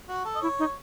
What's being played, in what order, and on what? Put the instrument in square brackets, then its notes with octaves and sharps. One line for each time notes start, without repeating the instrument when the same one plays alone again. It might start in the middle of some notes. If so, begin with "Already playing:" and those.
[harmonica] F#4
A4
D#5
[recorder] E4 [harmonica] C#5
[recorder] D#4